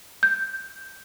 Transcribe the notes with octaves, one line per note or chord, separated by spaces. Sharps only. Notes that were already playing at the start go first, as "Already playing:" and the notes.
G6